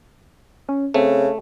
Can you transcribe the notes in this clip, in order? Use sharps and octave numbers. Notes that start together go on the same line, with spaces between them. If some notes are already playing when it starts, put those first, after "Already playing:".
C#4
C#3 A3 C4